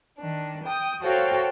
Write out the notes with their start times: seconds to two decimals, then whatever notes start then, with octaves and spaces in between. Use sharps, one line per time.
0.19 D#3 D4
0.65 G5 D#6
1.02 F#4 A4 C5 C#5 F5 G5